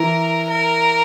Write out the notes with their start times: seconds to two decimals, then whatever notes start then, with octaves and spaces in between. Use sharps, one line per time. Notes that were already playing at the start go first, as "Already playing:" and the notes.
Already playing: E3 A#4
0.49 A#4